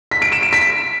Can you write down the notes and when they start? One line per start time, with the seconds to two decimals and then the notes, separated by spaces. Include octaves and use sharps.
0.11 B6
0.22 D7
0.32 E7
0.42 D7
0.53 B6